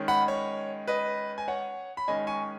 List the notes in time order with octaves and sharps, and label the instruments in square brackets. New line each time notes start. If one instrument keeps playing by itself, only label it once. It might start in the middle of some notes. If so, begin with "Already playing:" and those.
Already playing: [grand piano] D#3 G#3 C#4
F#5 B5
C#5
B4 D#5
G#5
C#5 F#5
B5
D#3 G#3 C#4 D#5 G#5
G#5 C#6